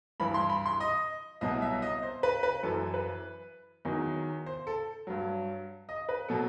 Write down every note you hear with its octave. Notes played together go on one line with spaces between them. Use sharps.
G2 E3 B5
C6
B5
C6
D#5
C2 B2 F#3 D#5
E5
D#5
C5
B4
B4
F#2 E3 A4
B4
E2 D#3 F#3
C5
A4
G2 F#3
D#5
B4
B2 F#3 A4